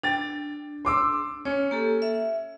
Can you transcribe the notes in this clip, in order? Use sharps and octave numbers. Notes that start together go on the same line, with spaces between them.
D4 G5 A6
C6 D6 E6
C#4 C#5
A#3 G4 A4
E5